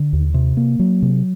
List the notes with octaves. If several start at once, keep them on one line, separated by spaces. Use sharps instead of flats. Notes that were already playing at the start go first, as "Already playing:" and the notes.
Already playing: D3
D#2
C3
A#3
F#3
C3